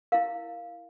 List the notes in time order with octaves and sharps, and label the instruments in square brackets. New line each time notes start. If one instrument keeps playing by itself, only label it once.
[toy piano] E4 A#4 F5